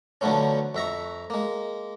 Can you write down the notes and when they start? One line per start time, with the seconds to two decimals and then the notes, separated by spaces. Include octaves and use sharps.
0.21 D3 F3 F#3 A3 B3 C#4
0.75 F2 E5 A#5 C#6
1.30 G#3 A#3